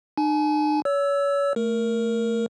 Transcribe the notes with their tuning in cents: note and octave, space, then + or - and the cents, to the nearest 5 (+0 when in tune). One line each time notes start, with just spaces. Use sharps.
D#4 -45 G#5 +35
C#5 +30 E6 +0
A3 +10 A#4 +0